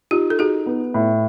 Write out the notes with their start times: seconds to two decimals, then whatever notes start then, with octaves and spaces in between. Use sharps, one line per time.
0.11 D#4 F4 G4
0.30 A4
0.39 D#4 F#4 G#4
0.66 B3
0.94 A2